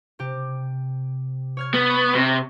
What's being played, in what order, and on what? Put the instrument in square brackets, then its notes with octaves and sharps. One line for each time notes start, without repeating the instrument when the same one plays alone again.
[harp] C3 G4
C#5 F6 G#6
[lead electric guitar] B3
[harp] C#6
[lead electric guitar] C3